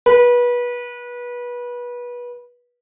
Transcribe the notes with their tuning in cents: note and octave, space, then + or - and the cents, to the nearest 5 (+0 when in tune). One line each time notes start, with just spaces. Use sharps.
B4 -25